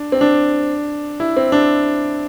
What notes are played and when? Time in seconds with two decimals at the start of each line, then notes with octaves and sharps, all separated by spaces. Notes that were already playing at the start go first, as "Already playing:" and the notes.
Already playing: D4
0.12 C4
0.21 D4
1.20 E4
1.37 C4
1.52 D4